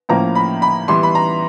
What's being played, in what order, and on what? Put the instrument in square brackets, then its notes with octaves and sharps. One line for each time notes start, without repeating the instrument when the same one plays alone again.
[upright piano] A2 F3 A#3 C#4 A#5
B5
B5
E3 G3 B3 C6
B5
A#5